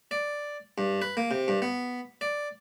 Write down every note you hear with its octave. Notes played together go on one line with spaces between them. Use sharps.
D5
G2
B4
A#3
C3
G2
B3
D5